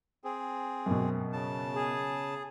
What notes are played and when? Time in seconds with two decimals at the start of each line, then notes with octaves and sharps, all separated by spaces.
0.24 C4 G#4
0.86 F#2 B2
1.33 C#3 A5
1.75 G#4